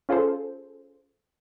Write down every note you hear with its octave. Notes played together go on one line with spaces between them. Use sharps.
C#4 F4 G#4 A4 C5